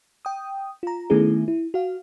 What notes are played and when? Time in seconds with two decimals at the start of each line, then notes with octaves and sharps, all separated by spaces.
0.25 G5 D#6
0.83 F4 A#5
1.10 D#3 A3 B3 C#4 E4 G#4
1.48 E4
1.74 F#4 F5